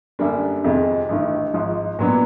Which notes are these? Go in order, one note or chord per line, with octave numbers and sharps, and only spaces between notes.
F#2 D3 G3 A#3 D4
F2 C3 D#3 G#3
A1 G2 D#3
G#1 G#2 F3
A#2 F#3 B3 D4